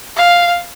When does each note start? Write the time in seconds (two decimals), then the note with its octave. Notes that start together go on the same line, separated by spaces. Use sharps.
0.16 F5